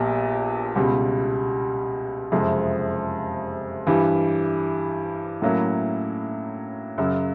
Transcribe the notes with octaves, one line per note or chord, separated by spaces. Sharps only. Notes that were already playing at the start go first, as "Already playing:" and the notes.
Already playing: A#1 A#2 G3 B3
C#2 B2 G3
F#1 F2 C3 F3 G#3
G2 E3 G3
A2 F#3 A#3 C#4 E4
F#2 C#3 F#3